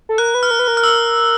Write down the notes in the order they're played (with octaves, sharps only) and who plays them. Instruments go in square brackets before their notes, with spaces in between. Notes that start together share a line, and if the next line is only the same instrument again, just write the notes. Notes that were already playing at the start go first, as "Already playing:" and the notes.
[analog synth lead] A4
[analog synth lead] A#4 [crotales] F#6
[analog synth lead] B4
[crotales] F6
[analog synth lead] A#4
B4
A#4
[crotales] F6
E6